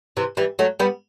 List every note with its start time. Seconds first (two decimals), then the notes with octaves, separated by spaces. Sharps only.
0.17 C3 E3
0.37 E3 G3
0.59 F#3 A3
0.79 G3 B3